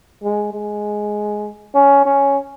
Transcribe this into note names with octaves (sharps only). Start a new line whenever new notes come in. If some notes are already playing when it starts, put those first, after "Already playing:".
G#3
G#3
C#4
C#4